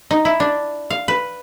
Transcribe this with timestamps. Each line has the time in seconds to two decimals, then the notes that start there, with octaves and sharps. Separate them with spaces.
0.11 D#4
0.25 E4
0.40 D4
0.90 F5
1.08 B4